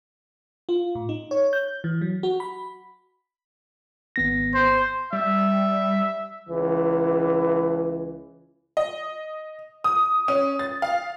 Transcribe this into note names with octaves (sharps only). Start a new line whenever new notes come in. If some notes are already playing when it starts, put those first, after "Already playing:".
F4
A2
D#4
C#5
G6
E3
F#3
F#4
B5
G#1 B3 A#6
C5
G3 E5
C#2 E3
D#5
D#6
C#4
A6
F5